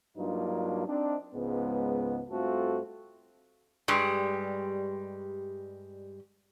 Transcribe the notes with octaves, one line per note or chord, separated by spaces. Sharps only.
G2 F#3 A#3 D4 D#4 F4
C4 D4 D#4
C#2 G#2 C#3 B3
G2 A3 C4 F4 F#4 A4
G2 G3 G#3